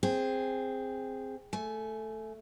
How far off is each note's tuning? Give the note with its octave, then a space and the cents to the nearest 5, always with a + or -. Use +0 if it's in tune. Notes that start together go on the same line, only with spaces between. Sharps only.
C4 +0 G#4 -10
A3 +0 G#5 +25